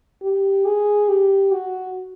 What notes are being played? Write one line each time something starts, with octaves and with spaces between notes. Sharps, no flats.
G4
G#4
G4
F#4